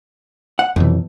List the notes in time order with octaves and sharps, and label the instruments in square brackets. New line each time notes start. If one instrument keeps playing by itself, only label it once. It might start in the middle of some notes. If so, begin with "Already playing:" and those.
[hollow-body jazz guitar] F#5
[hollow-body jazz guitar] B1 [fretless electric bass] F2 C3 E3